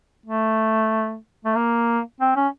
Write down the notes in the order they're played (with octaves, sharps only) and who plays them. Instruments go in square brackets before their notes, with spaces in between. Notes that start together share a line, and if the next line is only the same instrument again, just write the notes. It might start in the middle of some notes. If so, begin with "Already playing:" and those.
[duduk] A3
A3
A#3
C4
C#4